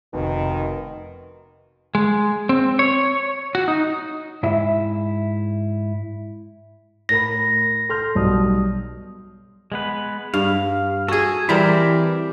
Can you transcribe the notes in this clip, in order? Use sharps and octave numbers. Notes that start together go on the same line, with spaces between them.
F1 B2 D#3
G#3
C4
C#5
F#4
D#4
G#2 E4 E5
A2 A#4 B5 A#6
A4 C6 F6 G6
B1 G3 D#6
G#3 B3 B4
G2 F5
F#4 G#4 A4 G#5
E3 G3 C4 G4 A#4 A5 B5